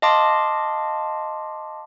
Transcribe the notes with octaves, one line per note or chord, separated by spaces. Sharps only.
D#5 F5 A5 C6 D6